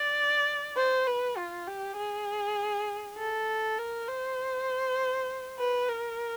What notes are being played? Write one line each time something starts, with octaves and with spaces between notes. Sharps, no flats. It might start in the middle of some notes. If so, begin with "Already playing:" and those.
Already playing: D5
C5
B4
F4
G4
G#4
A4
A#4
C5
B4
A#4